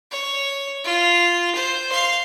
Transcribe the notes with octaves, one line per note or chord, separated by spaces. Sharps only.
C#5
F4
C5
F5 C6